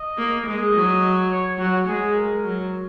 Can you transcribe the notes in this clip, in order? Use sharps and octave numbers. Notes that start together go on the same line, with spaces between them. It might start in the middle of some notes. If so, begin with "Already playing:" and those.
Already playing: D#5
A#3
G#3 D#5
F#3
C#5
F#3 F#4
G#3 G#4
A#4
F#3